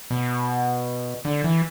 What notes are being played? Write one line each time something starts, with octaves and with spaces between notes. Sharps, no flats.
B2
D3
E3